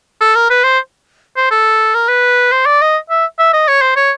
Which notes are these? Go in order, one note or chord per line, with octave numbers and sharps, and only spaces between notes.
A4
A#4
B4
C5
C5
A4
A#4
B4
C5
D5
D#5
E5
E5
D#5
C#5
C5
C#5